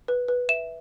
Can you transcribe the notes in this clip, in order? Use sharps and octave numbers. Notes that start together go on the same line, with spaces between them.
B4
B4
E5 E7